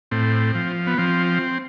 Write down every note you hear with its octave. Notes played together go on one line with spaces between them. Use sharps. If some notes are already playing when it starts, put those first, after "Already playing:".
A2 C4
F3
B3
F3 C4